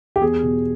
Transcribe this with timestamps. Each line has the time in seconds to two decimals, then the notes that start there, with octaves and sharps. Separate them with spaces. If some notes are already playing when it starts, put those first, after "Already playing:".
0.16 G4
0.21 E2 G#4
0.43 B2